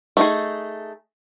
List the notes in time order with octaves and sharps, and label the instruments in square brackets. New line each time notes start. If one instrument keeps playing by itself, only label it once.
[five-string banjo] A3 D#4 G#4